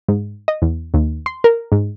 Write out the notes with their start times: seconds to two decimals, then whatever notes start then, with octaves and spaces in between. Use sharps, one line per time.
0.08 G#2
0.48 D#5
0.62 E2
0.94 D#2
1.26 C6
1.44 A#4
1.72 G#2